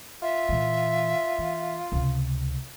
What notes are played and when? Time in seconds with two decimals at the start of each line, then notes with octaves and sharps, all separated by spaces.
0.22 F4 E5
0.49 A#2 E3
1.39 E3
1.92 C#2 C3